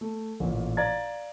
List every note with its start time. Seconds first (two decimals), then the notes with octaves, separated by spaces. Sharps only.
0.01 A3
0.40 A1 A#2
0.77 D5 F5 A#5 G#6 A6